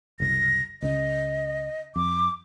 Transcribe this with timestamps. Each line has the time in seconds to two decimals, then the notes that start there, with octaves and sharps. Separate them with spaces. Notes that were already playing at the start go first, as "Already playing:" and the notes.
0.20 F#1 C2 A#6
0.82 C#2 C#3 D#5
1.96 F2 D6